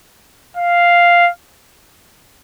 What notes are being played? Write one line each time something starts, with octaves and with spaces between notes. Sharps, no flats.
F5